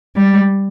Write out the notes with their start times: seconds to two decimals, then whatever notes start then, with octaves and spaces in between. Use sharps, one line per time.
0.16 G3